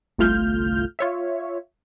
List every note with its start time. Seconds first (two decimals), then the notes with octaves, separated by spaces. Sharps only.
0.18 G1 C2 A3 F4 F6 G6
0.99 F4 C#5 E5